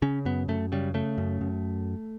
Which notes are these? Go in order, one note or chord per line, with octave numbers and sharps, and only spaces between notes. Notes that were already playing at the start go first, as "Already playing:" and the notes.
C#3 C#4
F#2 B3
F#2 A3
C#3 G3
C#3 A3
F#2
F#2